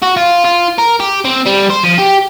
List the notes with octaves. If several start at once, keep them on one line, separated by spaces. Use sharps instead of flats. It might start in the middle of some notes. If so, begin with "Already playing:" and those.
F#4
F4
F4
A#4
G4
C4
G3
C5
F3
G4